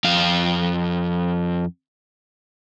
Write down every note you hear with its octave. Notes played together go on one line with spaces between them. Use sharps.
F2 F5